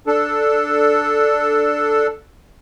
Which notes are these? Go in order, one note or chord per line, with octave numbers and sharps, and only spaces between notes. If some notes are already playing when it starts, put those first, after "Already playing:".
D4 A4